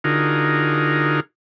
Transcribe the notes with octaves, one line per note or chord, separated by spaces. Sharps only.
D3 D#4 F4 F#4 G#4 A#4